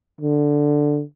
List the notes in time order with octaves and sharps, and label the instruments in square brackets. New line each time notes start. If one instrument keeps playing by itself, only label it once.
[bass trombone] D3